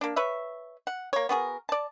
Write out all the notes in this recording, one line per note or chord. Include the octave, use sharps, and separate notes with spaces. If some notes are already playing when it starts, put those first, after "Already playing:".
A#3 D4
B4 C#5 E5
F#5
A#3 C#5
B3 F#4 G#4 A#4
D5 A5